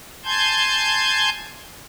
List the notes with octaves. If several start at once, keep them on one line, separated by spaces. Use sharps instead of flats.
G#5 A5 C6 G6 G#6